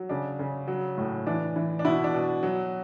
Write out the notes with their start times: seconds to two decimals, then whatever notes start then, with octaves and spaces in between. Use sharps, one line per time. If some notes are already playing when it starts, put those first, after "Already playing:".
Already playing: F#3
0.09 C#3 D4
0.39 C#3
0.68 F#3
0.98 A2
1.27 E3 D4
1.56 E3
1.79 D4
1.85 B2 E4
2.04 D4
2.14 B2
2.43 F#3